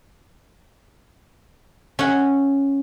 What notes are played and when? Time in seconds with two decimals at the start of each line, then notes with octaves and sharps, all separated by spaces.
1.99 C#4 F#5